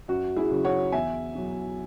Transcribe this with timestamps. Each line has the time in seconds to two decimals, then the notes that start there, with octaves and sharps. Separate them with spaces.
0.08 F#2 F#4
0.36 E4 G#4
0.51 C#3 F#3
0.65 C#5 F#5
0.92 E2 E5 G#5
1.35 B2 F#3